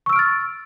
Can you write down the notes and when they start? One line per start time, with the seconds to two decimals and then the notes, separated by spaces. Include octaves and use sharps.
0.06 C#6
0.09 E6
0.13 D7
0.16 F6
0.19 A6